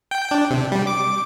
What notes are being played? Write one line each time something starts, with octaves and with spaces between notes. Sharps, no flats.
G5
D4
C3
G3
D6